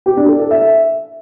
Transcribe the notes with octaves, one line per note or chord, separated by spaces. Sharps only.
G4
D4
A4
A4
E5